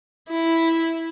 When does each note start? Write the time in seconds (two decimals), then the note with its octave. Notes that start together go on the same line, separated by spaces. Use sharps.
0.29 E4